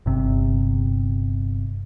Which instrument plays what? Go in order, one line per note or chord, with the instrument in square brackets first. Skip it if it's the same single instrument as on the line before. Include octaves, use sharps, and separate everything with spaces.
[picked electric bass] G1 C3